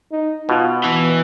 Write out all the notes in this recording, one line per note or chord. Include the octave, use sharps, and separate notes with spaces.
D#4
B2 F4
E3 B3